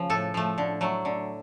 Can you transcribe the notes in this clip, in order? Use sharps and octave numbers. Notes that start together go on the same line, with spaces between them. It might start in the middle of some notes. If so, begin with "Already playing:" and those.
Already playing: C#3 F3
A2 A4
F3 A3
D3
F#3 A3
D3